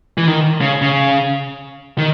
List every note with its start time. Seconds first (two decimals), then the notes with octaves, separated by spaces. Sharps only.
0.18 E3
0.27 D#3
0.61 C#3
0.82 C#3
1.98 D#3